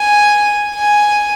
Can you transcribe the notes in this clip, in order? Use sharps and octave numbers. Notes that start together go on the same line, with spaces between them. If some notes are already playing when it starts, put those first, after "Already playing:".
Already playing: G#5
G#5